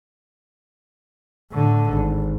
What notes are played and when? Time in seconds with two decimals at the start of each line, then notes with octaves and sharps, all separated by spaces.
1.51 A2 D3
1.90 G#1